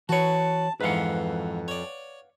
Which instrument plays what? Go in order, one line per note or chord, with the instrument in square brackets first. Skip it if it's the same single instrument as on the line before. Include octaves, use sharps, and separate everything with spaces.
[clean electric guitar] E3 C#5 [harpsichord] F#4 B4 [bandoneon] A5
[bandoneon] F2 [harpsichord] G#2 E3 [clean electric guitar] B4 F5 F#5
[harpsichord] C#5 D5